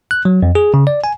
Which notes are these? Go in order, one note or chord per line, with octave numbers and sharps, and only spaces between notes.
F#6
F#3
F2
G#4
C#3
D5
G#5